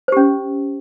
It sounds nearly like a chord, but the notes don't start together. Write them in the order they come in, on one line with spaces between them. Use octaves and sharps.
C5 G4 C#4